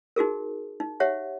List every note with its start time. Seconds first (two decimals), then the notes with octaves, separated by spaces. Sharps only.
0.16 D#4 F#4 G#4 A#4
0.80 D#4
1.00 G4 C#5 E5 F#5